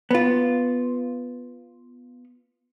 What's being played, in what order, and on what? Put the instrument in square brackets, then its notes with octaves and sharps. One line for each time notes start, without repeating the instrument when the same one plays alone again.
[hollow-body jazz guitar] B3 F4